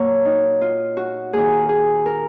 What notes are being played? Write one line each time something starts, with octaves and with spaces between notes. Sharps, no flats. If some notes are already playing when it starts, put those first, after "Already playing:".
Already playing: A#2 F#3 A#3 C#5
D#4
F4
F#4
D#2 D#3 A#3 G#4
G#4
A#4